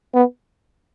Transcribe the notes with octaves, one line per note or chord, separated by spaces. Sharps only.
B3